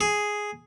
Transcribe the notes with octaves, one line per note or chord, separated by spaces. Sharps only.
G#4